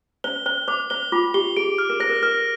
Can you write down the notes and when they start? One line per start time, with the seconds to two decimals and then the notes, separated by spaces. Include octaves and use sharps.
0.24 C5 G7
0.46 C5 G7
0.68 C5 D6
0.90 C5 G7
1.12 F4 D6
1.34 G4 G7
1.57 G#4 D7
1.78 F6
1.90 A#4
2.00 C5 A#6
2.10 A#4
2.22 A#4 F6